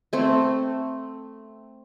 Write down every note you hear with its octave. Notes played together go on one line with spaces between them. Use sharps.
A3 C4